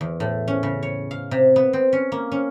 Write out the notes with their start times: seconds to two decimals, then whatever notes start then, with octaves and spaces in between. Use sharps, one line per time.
0.01 E2
0.20 A2
0.48 C#4
0.63 C#3
0.83 C#5
1.11 F5
1.31 C3
1.56 B3
1.73 C4
1.93 C#4
2.12 A#3
2.32 C#4